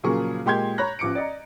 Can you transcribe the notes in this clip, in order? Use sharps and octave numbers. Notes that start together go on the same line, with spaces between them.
A#2 C#3 F3 F#3 G#4 C#6
A#2 G#3 G4 C6 G6 G#6
C#5 A#5 B5 F#6 A#6
A1 F3 D6 C#7 D7
D5 D#5 A#5